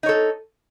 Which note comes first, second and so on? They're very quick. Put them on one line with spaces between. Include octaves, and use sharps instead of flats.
D#4 C#5 A4